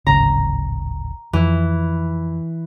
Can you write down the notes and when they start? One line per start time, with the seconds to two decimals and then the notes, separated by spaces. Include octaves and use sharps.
0.07 D1 G#1 C#3 A#5
1.33 F2 E3